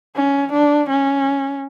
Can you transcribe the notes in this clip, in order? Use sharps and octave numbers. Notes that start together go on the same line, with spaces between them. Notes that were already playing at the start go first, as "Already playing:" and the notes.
C#4
D4
C#4